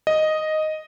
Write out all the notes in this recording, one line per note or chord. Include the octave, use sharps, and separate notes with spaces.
D#5